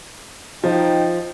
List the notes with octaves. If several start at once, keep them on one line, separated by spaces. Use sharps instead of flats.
F3 D#4 G5